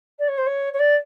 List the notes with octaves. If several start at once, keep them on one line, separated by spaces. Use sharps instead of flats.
D5
C#5
C5
C#5
C#5
D5